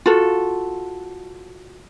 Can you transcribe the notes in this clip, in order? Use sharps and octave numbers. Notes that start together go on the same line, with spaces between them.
F4 F#4 A4